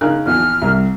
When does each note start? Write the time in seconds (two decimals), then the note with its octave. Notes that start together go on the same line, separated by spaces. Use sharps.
0.01 C#3 D#4 A#4 F#6
0.26 A#1 E2 E3 F6
0.62 C2 E5